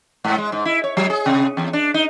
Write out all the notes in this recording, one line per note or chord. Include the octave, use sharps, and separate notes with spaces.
G#2
G#3
G#2
E4
C#5
F#3
G#4
C3
E2
D4
D#4